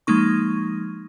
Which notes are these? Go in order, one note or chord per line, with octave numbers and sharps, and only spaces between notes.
F3 G#3 A#3 D#4 C#6